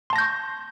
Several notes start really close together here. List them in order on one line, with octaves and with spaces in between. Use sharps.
C6 A5 A#6 G6 C#6